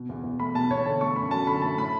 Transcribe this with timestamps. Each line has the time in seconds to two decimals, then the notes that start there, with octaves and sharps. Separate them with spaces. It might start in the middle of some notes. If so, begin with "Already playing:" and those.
Already playing: B2
0.09 E2
0.24 E2
0.40 A3 B5
0.55 B2 A5
0.70 E2 C#5
0.86 D3 A5
1.01 A3 C#6
1.16 F#2 B5
1.31 F#3 A5
1.47 D3 B5
1.62 A3 A5
1.77 A2 B5